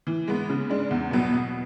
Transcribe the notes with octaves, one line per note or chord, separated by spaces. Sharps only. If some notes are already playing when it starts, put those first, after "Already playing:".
E3
G#3 B3
C#3
G#3 D4
E2
B2 F#3 B3
B2